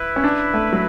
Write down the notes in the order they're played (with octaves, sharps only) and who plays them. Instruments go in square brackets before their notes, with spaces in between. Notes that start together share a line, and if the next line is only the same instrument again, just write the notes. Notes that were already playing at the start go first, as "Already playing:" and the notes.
Already playing: [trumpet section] E4 B4 E5
[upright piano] C#4
D4
A3
F#3